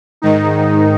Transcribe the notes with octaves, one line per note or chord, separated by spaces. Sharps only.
G#2 D#3 D#4